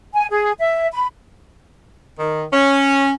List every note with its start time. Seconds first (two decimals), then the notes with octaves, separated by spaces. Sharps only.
0.15 G#5
0.31 G#4
0.59 E5
0.92 B5
2.19 D#3
2.53 C#4